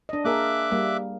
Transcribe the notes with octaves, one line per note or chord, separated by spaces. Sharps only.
D4 D#5
A#3 G#4 A#4 E5 D6 F#6
G3 A#3